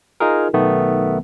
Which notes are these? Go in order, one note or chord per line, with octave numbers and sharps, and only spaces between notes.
D#4 F4 G#4 A#4
B1 D#3 A3 B3